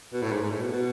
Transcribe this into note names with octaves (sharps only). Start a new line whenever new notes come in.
B2
A2
G#2
G#2
A2
B2
B2